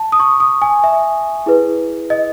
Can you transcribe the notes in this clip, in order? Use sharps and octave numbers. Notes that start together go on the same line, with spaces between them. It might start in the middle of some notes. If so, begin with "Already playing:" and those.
Already playing: A5
D#6
C#6
D#6
G#5
E5
E4 G#4 B4
D#5